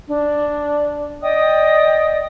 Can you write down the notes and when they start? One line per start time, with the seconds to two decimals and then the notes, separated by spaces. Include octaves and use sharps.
0.08 D4
1.22 D5 D#5 G5 D#6